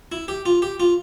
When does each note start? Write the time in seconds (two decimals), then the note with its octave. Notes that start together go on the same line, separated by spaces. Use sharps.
0.12 E4
0.28 G4
0.46 F4
0.62 G4
0.80 F4